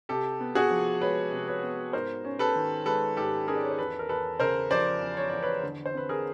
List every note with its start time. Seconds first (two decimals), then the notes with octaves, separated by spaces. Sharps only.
0.09 C3 G4 A4
0.40 B3
0.55 F#4 G#4
0.70 F3
1.01 G#3 B4 C#5
1.32 C3
1.48 B4 C#5
1.63 B3
1.93 G#2 A#4 C5
2.25 C#4
2.39 A4 B4
2.55 D#3
2.86 G#3 A4 B4
3.17 G#2 G4 A4
3.47 C#4 G#4 A#4
3.56 D5
3.63 C#5
3.71 C5
3.78 E2 A4 B4
3.99 A#4
4.09 E2 A4 B4
4.40 C#3 A#4 C5
4.71 F3 C5 D5
5.01 E2
5.17 C#5
5.30 E2 D5
5.42 B4 C#5
5.63 D3
5.86 C5
5.94 C4 B4
6.09 G#4 A#4